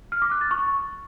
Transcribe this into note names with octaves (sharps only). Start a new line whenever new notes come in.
F6
D6
F#6
A6
C#6